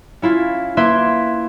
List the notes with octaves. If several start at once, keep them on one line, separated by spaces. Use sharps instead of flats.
C#4 E4 F4
A#3 E4 B4 E5 C6 G#6